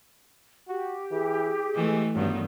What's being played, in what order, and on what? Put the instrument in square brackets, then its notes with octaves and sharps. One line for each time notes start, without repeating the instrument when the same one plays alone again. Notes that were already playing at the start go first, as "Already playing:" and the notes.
[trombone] F#4 [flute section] G4
[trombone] E3 [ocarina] G#4
[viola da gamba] E3 A3 [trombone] G#3
[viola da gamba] G2 D#3 B3 [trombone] F#3